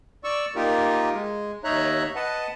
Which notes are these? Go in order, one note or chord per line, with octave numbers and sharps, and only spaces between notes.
D5 C#6 E6
A#3 D#4 F4 G4 A#4
G#3
D#2 D#4 C#5 E5 A#5 F#6
B4 D#5 F#5 A5